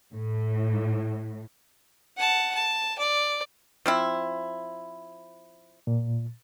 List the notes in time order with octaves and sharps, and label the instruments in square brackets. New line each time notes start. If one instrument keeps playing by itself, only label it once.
[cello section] A2
[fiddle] F#5 A5
A5
D5
[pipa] F3 C4 E4
[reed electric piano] A#2